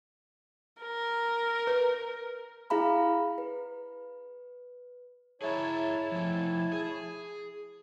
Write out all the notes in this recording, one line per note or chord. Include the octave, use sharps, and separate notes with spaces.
A#4
B4
E4 G#4 F5 A#5 B5
B4
E4 G#4 C#5 E5 A5 A#5
F3 A3
G#4